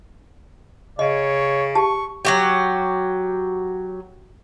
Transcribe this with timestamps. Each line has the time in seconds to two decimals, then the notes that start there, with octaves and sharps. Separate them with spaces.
0.99 C#3 C#5 D#5
1.75 G4 A5 C#6
2.25 F#3 F#4 G4